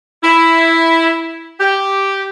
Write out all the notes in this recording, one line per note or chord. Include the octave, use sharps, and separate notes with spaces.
E4
G4